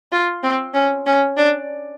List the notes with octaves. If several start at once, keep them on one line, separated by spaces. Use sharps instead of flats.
F4
C4
C#4
C#4
D4